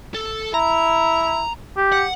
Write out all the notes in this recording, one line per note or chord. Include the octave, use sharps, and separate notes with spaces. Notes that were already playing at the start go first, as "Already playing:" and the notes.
A4
E4 A#5
G4
F#5